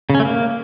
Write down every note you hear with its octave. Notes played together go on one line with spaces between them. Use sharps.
C#3
C#4
A3
A#3